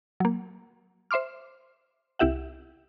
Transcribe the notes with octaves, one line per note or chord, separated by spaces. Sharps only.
F#3 A#3
C5 E5 C6 D6 F6
C2 E4 G4 E5 F#5